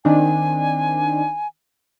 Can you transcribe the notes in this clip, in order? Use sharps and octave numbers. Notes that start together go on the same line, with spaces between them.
D#3 C4 D4 G#5